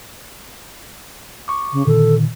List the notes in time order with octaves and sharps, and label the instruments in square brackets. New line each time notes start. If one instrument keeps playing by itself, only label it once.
[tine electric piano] C#6 D6
[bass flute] C#3
[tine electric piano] A#2 D3 D#3 [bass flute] A4